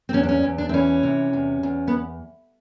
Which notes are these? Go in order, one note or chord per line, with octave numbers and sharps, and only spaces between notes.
C4
E2 C#4
D4
C#4
E2
D4
C4
E3 C#4
C3
E2
E2
B3